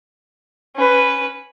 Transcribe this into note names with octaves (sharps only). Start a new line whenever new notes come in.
C#4 B4